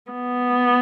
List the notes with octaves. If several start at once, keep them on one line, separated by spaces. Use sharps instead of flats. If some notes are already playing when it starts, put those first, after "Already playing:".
B3